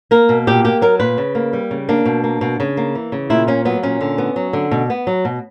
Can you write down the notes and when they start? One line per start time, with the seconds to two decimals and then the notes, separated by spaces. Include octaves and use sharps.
0.11 A#3 A#4
0.29 B2
0.47 A#2 G4
0.64 A#3 G4
0.82 F#3 A#4
1.00 A#2 B4
1.18 C#3
1.35 A#3
1.53 G3
1.71 C#3
1.89 A#3 D4
2.05 B2
2.24 A#3
2.41 B2
2.60 C#3
2.77 A#3
2.95 E3
3.12 C#3
3.30 A#2 E4
3.47 A#3 C#4
3.65 F#3 B3
3.83 A#2 C#4
4.01 D3
4.18 B3
4.36 F#3
4.53 D3
4.71 B2
4.90 B3
5.07 F#3
5.25 B2